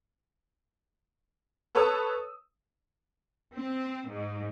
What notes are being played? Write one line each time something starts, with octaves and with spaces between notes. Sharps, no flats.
A4 B4 C#5 A5 D#6 E6
C4
G#2